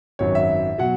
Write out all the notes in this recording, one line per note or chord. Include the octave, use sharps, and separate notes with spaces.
G#1 F#2 F#3 C#5
E5
B2 F#3 F#5